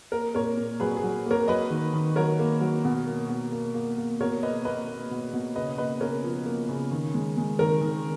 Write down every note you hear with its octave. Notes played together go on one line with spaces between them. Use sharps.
A#3 A#4
A#2 A#4 C#5
A#2
F#3 G#4 B4
G#4
F#3
A#3 A#4 C#5
F#3 B4 D#5
D#3
D#3
F#3 A#4 C#5
A#3
F#3
B2
A#3
B2
A#3
A#3
A#3
B2 A#4 C#5
A#3 B4 D#5
A#3 B4 D#5
A#3
B2
B2
C#3 B4 D#5
A#3 B4 D#5
C#3 A#4 C#5
F3
A#3
C#3
D#3
G#3
G#3
D#3 A#4
D#3